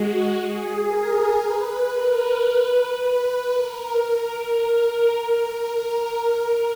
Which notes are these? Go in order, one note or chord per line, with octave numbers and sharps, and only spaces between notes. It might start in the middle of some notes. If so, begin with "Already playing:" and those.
Already playing: G#3 F#4
G#4
A#4
B4
A#4
B4
A#4